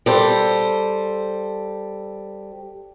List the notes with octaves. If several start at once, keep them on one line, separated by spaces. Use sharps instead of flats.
G3 A4 C5